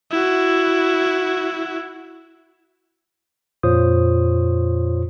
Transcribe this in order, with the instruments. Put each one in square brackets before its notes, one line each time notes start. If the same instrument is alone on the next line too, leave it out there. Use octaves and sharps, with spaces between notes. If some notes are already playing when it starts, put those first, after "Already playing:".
[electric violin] E4 F#4
[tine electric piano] F2 A#2 F4 C5 C#5 D#6